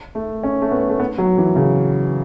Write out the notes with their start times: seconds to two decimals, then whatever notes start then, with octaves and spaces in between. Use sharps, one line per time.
0.15 A3
0.44 C#4
0.62 A3
0.71 B3
0.89 A3
1.00 B3
1.18 F#3
1.38 E3
1.56 C#3